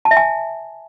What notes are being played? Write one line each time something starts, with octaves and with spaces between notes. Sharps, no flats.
A5
E5
G#5